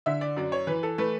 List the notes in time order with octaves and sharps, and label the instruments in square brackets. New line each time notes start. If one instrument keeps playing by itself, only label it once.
[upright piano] D3 E5
D5
F#2 D5
C#5
E3 B4
A4
A3 B4